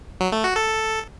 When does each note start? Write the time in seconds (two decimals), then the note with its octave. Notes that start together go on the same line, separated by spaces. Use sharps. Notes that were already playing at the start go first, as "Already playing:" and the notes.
0.21 F#3
0.32 A3
0.44 F#4
0.56 A4